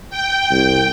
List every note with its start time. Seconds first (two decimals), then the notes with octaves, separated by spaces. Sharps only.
0.10 G5
0.51 C2